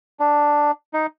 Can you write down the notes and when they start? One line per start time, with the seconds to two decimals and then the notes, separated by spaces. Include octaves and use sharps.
0.20 D4
0.93 D#4